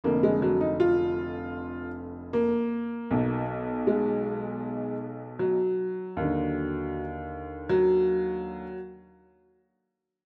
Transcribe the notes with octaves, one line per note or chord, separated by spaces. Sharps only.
F1 F2 D3 A#3
G#3
F#3
D#4
F4
A#3
B1 B2
G#3
F#3
D#2 D3
F#3